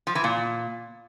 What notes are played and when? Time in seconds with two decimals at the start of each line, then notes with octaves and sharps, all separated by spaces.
0.07 F3
0.15 E3
0.24 A#2